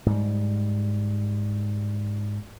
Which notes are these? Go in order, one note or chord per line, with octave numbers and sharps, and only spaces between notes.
G#2 G3